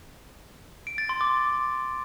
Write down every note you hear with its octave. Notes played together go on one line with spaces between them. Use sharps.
D7
A6
C6
D6